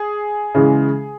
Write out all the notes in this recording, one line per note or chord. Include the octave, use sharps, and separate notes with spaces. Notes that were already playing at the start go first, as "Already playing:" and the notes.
Already playing: G#4
C#3 E3 G#3